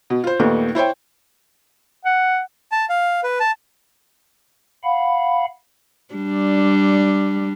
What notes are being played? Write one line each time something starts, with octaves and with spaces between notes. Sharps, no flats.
B2
F4 C5
D#2 A#2 D#3 A3 B3
E4 C5 C#5 G5
F#5
A5
F5
B4
A5
F5 F#5 B5
G3 D4